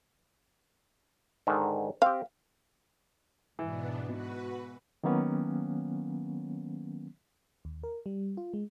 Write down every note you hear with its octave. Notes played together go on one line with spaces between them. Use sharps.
G#2 D3 D#3
C4 G4 F5
G#2 B2 E3 B3 D4
B2 F#4 B4
D#3 F#3 A#3 B3 C#4
D#2
A#4
G3
F4
G#3